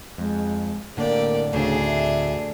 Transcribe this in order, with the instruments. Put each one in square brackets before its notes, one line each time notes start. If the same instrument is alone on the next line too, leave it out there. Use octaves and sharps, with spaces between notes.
[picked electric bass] F2 [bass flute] G#3
[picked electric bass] A2 D3 [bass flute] A#3 [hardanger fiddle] G4 D5
[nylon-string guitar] D2 [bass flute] C#3 [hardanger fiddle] D4 G#4
[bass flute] E5